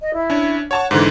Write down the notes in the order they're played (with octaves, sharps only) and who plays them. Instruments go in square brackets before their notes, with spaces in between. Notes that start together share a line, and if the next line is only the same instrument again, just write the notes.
[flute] D#5
E4
[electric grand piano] C#4 D4
[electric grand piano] C#5 A5 C#6 [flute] F#5
[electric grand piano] G#2 D3 E3 [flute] C5